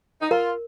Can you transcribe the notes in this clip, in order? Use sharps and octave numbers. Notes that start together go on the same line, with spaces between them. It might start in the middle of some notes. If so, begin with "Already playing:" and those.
D#4
F4 A#4